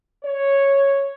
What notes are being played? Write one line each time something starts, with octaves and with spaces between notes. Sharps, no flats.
C#5